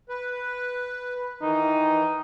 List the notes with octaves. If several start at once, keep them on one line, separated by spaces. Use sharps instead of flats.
B4
D#3 E3 D#4